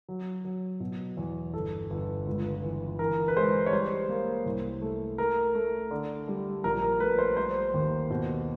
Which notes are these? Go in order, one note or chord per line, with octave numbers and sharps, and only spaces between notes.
F#3
F#3
B2
E2
G1 A4
G1
C#2
E3
E3 A#4
B4
G#3 C5
C#5
G3 C5
A#3
C2
A3
A3 A#4
A3
D3
G3
A#1 A#4
A#4
A3 B4
C5
G3 C5
D#2
B2